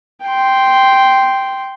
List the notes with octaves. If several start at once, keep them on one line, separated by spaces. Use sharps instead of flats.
G5 C6